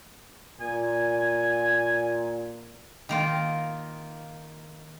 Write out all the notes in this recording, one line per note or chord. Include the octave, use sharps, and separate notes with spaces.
A#2 G#5
D#3 A#3 F4